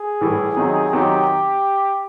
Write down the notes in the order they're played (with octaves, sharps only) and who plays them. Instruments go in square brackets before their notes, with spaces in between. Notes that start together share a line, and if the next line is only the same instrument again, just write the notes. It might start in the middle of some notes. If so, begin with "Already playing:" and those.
Already playing: [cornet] G#4
[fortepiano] A2 E3 G3
C3 D#3 F#3
[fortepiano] C3 D#3 F#3 [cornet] G4